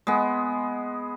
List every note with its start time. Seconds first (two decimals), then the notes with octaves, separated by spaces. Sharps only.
0.07 G#3 B3